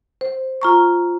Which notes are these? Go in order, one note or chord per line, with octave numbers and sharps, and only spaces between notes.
C5
F4 A#5 C#6